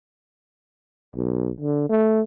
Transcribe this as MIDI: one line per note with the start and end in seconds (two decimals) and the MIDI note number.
1.15 1.50 35
1.61 1.85 50
1.90 2.21 57